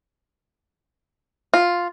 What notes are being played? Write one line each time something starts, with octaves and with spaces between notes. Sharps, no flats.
F4